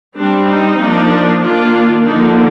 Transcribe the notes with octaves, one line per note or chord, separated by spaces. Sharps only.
G3 C4 D4
D#4
F3 A#3 D4
D#3 A#3 D4 F4
D3 F3 A#3 D4 D#4